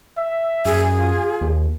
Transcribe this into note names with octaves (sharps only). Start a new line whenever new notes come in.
E5
F#2 G#4
F4
D#2